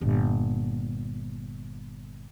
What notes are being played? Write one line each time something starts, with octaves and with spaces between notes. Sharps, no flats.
G1 A#2